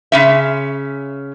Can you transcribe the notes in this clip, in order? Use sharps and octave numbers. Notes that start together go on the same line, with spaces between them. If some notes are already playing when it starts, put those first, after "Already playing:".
C#3 C#4 E5